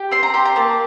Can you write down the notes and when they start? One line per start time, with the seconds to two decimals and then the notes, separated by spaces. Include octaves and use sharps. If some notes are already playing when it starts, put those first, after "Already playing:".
Already playing: G4
0.11 C4 C6
0.23 A#5
0.34 G4 C6
0.46 A#5
0.56 A#3 A5